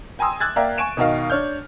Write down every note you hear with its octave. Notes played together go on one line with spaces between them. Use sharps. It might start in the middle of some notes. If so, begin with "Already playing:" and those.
G5 G#5 A#5 C6 D#6 E6
D6 E6 F#6 G#6 A6
A#3 D5 E5 F5 G5 A#5
G#5 C#6 D7 E7
B2 D#3 A#4 D#5 F5
D4 C#5 F6 G6